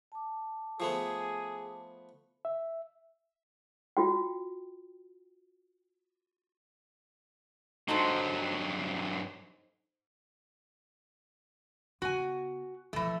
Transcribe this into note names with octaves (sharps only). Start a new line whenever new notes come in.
A5 D6
F3 A3 B3 G#4
E5
F4 F#4 G5
G2 F#3 D#4 A4 C5
C#3 B3 F#4 G#5
B2 E3 F3 A3